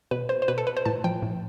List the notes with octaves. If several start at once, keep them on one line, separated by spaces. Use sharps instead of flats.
B2 B4
C5
C5
B2 B4
A4
B4
C5
A2 A5
F3 G5
A2